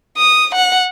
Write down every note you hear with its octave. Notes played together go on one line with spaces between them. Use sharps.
D#6
F#5